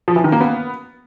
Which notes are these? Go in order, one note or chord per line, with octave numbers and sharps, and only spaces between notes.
F3
E3
D#3
A#3
B3